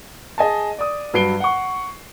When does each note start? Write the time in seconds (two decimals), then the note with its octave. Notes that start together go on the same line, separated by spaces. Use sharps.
0.38 G#4 D#5 G#5 A5
0.79 D5 D#6
1.14 G2 F#3 B4 C7 D7 G7
1.40 F#5 C#6